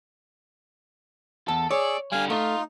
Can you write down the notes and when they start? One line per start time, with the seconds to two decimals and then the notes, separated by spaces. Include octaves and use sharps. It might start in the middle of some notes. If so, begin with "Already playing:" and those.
1.48 E2 A4
1.71 G#4 C#5 D5 C#6 E6
2.12 D3 G3 F5 G#5
2.30 A3 D#4 F4